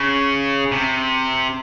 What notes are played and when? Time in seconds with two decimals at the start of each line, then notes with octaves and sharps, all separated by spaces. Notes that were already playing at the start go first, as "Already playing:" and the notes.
Already playing: C#3
0.72 C3